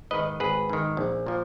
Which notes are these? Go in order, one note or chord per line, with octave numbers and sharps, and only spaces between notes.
G#2 D#3 B4 D#5
G#1 G#4 B4
G#2 D#3
A#1
A#2 F3